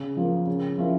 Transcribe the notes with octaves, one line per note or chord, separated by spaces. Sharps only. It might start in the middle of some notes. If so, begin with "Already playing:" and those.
Already playing: C#3
F3 A#3
C#3
F3 C#4 E4 A#4